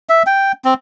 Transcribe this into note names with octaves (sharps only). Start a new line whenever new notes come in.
E5
G5
C4